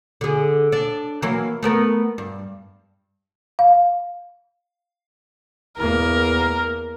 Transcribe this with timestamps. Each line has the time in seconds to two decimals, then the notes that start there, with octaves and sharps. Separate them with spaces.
0.21 D3 G#4
0.72 D4
1.22 E3 F#3 A#3
1.63 A3 B3 A#4
2.18 G2
3.59 F5
5.79 E2 A#3 A#4